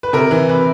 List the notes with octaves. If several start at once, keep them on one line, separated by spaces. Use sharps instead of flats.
B4
C3 A#4
E3
C3 B4